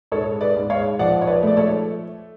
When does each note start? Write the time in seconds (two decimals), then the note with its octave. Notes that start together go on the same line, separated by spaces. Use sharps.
0.12 G#2 A4 C#5
0.41 B4 D5
0.56 G#2
0.70 C#5 F5
0.99 F3 D5 F#5
1.22 C#5
1.27 B4 D5
1.43 A3 D5
1.57 A4 C#5